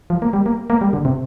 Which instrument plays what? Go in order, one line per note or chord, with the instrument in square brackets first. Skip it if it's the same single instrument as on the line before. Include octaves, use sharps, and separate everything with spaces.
[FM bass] F3
A#3
G3
A#3
A#3
G3
D3
C3